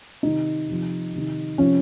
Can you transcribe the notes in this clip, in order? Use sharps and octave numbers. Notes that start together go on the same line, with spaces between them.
C3 D#3 D#4
C3 F3
C3 D#3
C3 F3 C#4